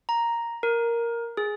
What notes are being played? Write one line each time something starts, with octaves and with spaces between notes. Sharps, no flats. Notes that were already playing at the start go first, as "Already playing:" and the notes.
A#5
A#4
G#4